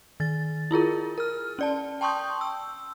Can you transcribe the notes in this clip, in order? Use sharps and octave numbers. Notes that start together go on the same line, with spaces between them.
D#3 A6
E4 F4 G#4 A#4
A#4 F6
C#4 D5 A5
G5 A5 C6 C#6 D#6 G6
E6